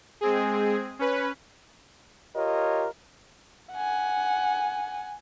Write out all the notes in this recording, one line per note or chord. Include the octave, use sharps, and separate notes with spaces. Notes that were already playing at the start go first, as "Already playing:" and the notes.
G#3 C4 G#4
C#4 B4
F4 G4 A#4 C#5 D#5
F#5 G#5